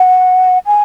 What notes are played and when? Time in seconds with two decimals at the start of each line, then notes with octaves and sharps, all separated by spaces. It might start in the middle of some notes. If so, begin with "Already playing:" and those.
Already playing: F#5
0.66 G#5